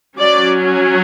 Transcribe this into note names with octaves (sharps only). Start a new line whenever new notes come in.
F#3 C#4 D5